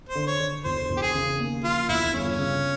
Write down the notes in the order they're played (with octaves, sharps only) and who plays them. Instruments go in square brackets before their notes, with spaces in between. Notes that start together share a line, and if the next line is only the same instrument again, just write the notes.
[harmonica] C5
[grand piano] D3
[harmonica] C#5
[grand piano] D3
[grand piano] E1 [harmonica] C5
[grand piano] E1
[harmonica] G4
G#4
[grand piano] C#3
D#2
[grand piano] F3 [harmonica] F4
[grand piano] E1 [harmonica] E4
[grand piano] G1 [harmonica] C#4
[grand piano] C#3